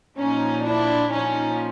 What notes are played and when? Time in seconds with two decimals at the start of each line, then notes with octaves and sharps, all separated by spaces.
0.17 A#2 F3 C#4 D#4
0.65 D4 E4
1.12 A#2 F3 C#4 D#4